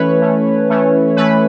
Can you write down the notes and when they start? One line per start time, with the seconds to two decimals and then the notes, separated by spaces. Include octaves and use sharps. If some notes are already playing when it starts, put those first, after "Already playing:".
Already playing: E3 A3 C#4 B4 C#5
0.21 E3 A3 C#4
0.69 E3 A3 C#4
1.17 E3 A3 C#4 B4